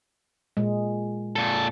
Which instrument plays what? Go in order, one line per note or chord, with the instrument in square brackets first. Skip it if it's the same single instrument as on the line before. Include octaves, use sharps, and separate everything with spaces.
[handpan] A#2 G#3
[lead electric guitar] A#2 A4